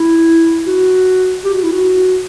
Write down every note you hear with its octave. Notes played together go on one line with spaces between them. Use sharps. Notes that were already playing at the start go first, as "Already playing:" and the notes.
Already playing: E4
F#4
G4
F#4
E4
F#4